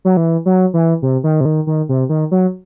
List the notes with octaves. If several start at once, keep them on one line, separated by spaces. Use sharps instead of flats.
F#3
E3
F#3
E3
C3
D#3
C3
D#3
D#3
C3
D#3
F#3